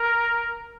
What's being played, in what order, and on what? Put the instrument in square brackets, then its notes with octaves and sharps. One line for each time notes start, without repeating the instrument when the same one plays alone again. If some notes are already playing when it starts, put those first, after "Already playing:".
Already playing: [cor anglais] A#4